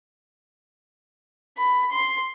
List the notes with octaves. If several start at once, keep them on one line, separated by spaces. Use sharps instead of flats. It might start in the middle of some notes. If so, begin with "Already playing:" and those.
B5
C6